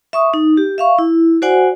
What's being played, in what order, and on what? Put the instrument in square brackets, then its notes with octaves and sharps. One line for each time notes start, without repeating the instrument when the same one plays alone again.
[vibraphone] E5 C#6 D#6
D#4
G4
E5 F5 C#6
E4
F#4 C5 D5 F#5 G#5